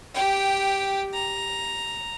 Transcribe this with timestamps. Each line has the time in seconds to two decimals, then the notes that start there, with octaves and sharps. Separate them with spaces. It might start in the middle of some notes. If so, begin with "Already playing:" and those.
0.14 G4 G5
1.13 A#5